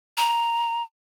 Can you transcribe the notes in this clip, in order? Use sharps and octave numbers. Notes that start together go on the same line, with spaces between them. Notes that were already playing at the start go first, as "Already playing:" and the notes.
A#5